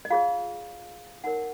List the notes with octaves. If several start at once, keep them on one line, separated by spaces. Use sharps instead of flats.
D#5
F4 G#4 C#5 F5
D#4 A#4 C#5 F#5